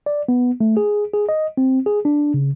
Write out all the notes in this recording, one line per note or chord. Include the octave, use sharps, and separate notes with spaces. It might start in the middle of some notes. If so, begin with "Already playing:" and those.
D5
B3
A3
G#4
G#4
D#5
C4
G#4
D4
C#3